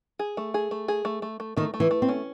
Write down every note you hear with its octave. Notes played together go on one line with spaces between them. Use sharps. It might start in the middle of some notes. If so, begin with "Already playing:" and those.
G#4
A3
G#4
A3
G#4
A3
A3
A3
D#3 A3
A3
E3
A3
C4
C#4